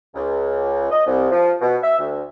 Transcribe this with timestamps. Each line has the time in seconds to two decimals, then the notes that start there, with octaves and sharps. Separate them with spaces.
0.15 C#2
0.91 D#5
1.06 C2
1.31 F3
1.61 B2
1.82 E5
1.98 D2